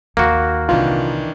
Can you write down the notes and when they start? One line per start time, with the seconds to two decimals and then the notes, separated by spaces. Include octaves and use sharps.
0.17 D#2 D#3 A#3 F#4
0.69 C2 A#2 D#3 E3 D4 F4